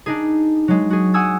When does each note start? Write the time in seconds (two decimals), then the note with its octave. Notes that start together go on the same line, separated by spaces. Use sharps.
0.06 D4 D#4 G#4
0.68 F#3 G#3
0.90 F#4 G#4
1.14 F#5 G#5 D#6 E6 G#6